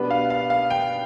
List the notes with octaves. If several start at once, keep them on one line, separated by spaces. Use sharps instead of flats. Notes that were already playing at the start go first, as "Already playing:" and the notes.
Already playing: B2 G3 B3 D4 B4
F5
F5
F5
G5